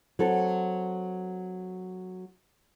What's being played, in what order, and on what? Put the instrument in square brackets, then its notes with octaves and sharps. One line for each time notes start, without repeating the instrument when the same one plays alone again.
[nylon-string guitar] F#3 C4 A4